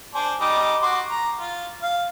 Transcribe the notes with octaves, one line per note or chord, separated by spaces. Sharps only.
D4 G#4 C5
G3 D#4 D6
F#4 C6 D6
A#5
F4
F5